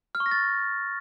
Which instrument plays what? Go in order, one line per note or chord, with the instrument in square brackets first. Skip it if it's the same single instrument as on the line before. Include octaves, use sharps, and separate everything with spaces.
[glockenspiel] F6
C#6
A#6
A6